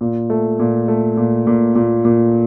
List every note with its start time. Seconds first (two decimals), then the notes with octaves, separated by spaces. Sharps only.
0.01 A#2
0.30 A3
0.59 A#2
0.88 A3
1.17 A#2
1.47 A#2
1.75 A#2
2.05 A#2